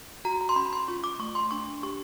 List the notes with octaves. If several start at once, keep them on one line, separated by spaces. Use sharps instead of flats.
F#4 A#5
A#5
C6
C#4 B5
B5
C6
F4 C#6
D6
A3 C#6
C6
D4 C#6
G4 C#6